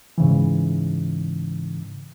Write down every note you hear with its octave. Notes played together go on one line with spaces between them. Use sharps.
G#2 C#3 E3